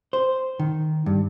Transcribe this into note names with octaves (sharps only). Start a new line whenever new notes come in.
C5
D#3
G2